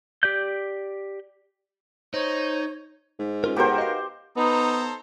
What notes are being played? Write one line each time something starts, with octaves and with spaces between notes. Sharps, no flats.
G4 D5 G6
D#4 C5 C#5
G#2
C#4 F4 A#4
B3 F#4 G4 A#4 C5 G5
D#5 F5
B3 D#4 A4 C5 A#5